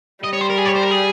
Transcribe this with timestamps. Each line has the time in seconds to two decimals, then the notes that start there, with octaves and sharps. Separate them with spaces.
0.24 G3 D#5
0.33 C#5
0.41 C5
0.50 A#4
0.58 G#4
0.65 C#5
0.75 C5
0.82 A#4
0.91 G#4